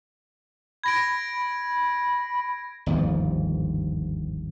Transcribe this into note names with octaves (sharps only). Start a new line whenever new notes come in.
B5 G#6 A#6 D7
G1 D#2 G#2 F3